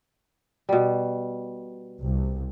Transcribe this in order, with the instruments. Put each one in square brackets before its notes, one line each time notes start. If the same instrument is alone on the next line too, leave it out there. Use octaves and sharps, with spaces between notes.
[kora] B2 G3
[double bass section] C2